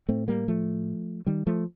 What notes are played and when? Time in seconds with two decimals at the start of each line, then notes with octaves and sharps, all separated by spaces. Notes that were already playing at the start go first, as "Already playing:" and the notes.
0.09 A2 A3 C4
0.28 G3 A#3
0.48 F3 A3
1.26 D#3 G3
1.47 F3 A3